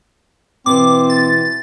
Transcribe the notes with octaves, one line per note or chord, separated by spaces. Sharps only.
B2 E3 C4 D6
A6